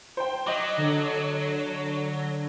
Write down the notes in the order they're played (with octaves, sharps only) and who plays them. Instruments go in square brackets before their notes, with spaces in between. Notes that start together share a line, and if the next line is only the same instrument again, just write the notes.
[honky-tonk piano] C5 G5
[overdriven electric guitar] F#3 [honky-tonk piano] D#5 D6
[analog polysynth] D3